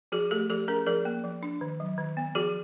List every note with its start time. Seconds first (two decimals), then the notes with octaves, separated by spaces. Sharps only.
0.12 F3 F#4 G#4
0.31 A3 G4 A4
0.49 F3 G4 A4
0.68 C#4 G#4 A#4
0.87 F3 G#4 A#4
1.05 A#3
1.24 F3
1.43 D4
1.61 D#3
1.80 F#3
1.98 D#3
2.17 B3
2.35 F3 F#4 G#4